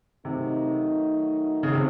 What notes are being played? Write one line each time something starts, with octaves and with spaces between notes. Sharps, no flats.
C3 D#3 F#3 A3 D#4
C#3
C3